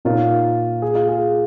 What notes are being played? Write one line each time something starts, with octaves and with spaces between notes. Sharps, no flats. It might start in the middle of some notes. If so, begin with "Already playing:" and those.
A#2 A#3 D#4 F4 C#5
G#4
F4
G#4